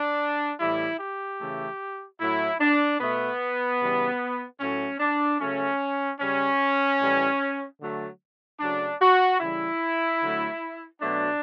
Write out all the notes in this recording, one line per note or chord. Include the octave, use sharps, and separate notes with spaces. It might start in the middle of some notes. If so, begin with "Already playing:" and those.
Already playing: D4
A2 E3 G3 E4
G4
C#3 E3 A3
A2 F#3 A3 E4
D4
B2 A3 B3
C#3 E3 G3
A2 F#3 A3 C#4
D4
C#3 F#3 A3 C#4
C#3 G3 C#4
A2 E3 G3
D3 F#3 A3
C#3 F#3 A3 D4
F#4
C#3 E3 G3 E4
D3 F#3 A3
B2 F#3 A3 D4